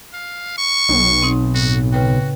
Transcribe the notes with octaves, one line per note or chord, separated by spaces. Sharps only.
F5
C#6
B1
C4 D#4
A2 F#4
C#3 F#4 B4 G5